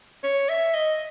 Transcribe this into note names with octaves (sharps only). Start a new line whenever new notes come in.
C#5
E5
D#5